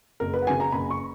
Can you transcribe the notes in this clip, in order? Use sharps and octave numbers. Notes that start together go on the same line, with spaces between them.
F#1 A#4
B4
F#5
F#2 C#3 G#5
A#5
F#1 B5
C#6